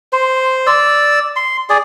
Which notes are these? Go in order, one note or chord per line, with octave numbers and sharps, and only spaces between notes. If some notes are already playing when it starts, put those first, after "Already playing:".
C5
D5 E6
C6
G#4 D5